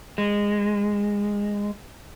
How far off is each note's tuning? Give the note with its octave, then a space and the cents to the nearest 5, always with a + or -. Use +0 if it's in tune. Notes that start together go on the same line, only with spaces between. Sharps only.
G#3 -15